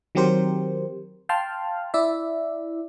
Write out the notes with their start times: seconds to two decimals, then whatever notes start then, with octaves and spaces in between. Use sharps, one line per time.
0.15 D#3 F#3 C4 G4 A#4 C5
1.29 F5 G5 A5 C6 F6
1.94 E4 D5 E5